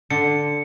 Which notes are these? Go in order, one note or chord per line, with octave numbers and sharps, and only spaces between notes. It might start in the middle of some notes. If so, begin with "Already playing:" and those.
D3 C#7